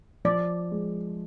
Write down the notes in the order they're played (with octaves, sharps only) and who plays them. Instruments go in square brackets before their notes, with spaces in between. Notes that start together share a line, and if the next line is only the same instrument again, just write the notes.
[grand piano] F3 [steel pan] D5
[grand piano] G#3